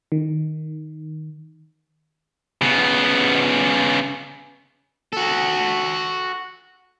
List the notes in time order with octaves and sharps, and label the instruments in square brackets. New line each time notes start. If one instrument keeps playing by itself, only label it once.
[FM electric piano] D#3
[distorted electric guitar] C#3 B3
F#4 A4